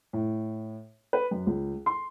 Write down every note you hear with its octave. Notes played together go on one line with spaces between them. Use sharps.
A2
B4
F#2
C#2
C6